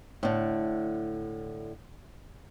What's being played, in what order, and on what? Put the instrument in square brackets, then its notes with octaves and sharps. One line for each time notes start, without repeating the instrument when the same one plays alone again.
[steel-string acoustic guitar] A2 D3